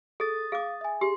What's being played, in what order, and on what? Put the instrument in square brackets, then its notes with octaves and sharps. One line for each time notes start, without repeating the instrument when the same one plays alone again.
[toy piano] G#4 [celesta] A4 [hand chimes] D#6 A6
[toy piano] G#4 D6 [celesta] F5
[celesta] E5 G#5
[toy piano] G4 [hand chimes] G#4 C6